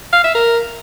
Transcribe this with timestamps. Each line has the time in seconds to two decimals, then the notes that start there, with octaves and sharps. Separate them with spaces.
0.13 F5
0.24 E5
0.35 A#4